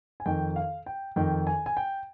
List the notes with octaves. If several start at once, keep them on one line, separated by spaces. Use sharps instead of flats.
G#5
F2 D#3 G5
F5
G5
F2 D#3 G5
G#5
G#5
G5